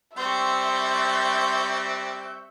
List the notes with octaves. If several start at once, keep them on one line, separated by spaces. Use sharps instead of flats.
G3 C4 E5 C6 C#6 G6